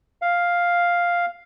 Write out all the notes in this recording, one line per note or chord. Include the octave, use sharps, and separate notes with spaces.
F5